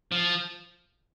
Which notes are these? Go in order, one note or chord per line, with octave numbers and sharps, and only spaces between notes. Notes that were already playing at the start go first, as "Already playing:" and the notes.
F3